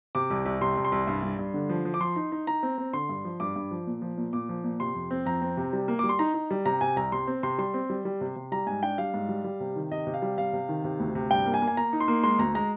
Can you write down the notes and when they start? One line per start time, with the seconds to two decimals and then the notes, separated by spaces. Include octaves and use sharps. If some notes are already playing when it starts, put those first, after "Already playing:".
0.15 C3 D6
0.30 C2
0.46 C2
0.61 C3 C6
0.77 C2
0.85 C6
0.92 C2
1.07 G2
1.23 G2
1.39 G2
1.54 D3
1.69 F3
1.85 F3
1.94 D6
2.00 F3 C6
2.16 D#4
2.32 D#4
2.47 D#4 A#5
2.63 C4
2.78 C4
2.93 D3 C6
3.09 G2
3.25 F3
3.40 G2 D6
3.56 G2
3.71 F3
3.87 A#2
4.02 F3
4.18 A#2
4.33 A#2 D6
4.49 F3
4.64 A#2
4.80 C3 C6
4.95 F2
5.11 C4
5.26 F2 A#5
5.42 C4
5.57 C3
5.73 G3
5.88 A#3
5.99 G3 D6
6.09 C6
6.19 D#4 A#5
6.34 D#4
6.51 G3
6.66 C3 A#5
6.81 C3 G#5
6.96 C2 A#5
7.12 C3 C6
7.28 C4
7.43 C3 C6
7.58 G3 C6
7.74 C4
7.90 G3
8.05 G3
8.21 C3
8.36 C3
8.52 G3 A#5
8.67 G#2 G#5
8.83 D4 G5
8.98 G3 F5
9.14 G#2
9.29 G3
9.44 G3
9.60 C3
9.76 D#3
9.91 C3 D#5
10.07 C3
10.14 F5
10.22 G3
10.38 C3 F5
10.53 C3
10.69 D#3
10.84 C3
11.00 D2
11.15 C3
11.31 G2 G5
11.46 A#3
11.54 G#5
11.62 A#3
11.68 G#5
11.77 A#3 A#5
11.93 D#4
12.00 C6
12.08 A#3
12.24 G#3 C6
12.39 D2 A#5
12.55 G#3 A#5